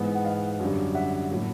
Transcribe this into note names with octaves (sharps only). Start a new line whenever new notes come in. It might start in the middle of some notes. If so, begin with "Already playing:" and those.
Already playing: G#2 E3 G#3 B3
F#5
D#5 F5
F#2 D3 G3
E5 F#5
A2 F#3 A#3